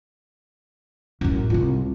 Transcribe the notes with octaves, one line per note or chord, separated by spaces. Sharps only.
A1 F#2
C2 F4